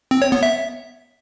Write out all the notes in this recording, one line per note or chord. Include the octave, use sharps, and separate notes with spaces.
C4
C#5
B3
E5